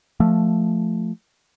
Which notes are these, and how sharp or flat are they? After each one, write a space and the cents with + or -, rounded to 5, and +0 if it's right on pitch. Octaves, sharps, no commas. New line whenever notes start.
F3 +0 A3 +0